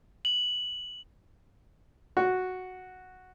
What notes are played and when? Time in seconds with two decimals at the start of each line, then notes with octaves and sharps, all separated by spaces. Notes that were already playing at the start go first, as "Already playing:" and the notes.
0.25 F#7
2.17 F#4